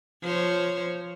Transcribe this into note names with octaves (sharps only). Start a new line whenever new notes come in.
F3 C5 C#5